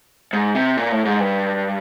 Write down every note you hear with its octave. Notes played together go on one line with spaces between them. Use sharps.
G#2
C3
A#2
A2
G#2
G2